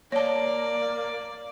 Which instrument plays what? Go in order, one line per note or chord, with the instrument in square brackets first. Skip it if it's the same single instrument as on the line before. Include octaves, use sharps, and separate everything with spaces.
[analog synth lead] A#3 [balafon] C#5 A5 [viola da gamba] D5